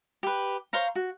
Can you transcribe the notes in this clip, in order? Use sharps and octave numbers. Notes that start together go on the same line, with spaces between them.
G4 B4
C5 C#5 F5 A#5
F#4